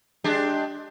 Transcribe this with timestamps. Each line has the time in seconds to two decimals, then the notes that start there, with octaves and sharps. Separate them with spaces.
0.24 G#3 D4 G4